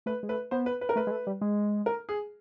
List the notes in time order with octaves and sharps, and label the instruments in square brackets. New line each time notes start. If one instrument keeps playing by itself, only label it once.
[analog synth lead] A3 [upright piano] B4
[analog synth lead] G#3
[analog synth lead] A3 [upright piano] B4
[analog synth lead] B3 [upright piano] C5
[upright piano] B4
B4
A#4
[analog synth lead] A3 [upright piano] B4
[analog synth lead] G#3
A3
G3
G#3
[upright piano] A#4
G#4